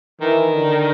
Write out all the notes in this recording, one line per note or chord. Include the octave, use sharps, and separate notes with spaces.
D#3 E3
D3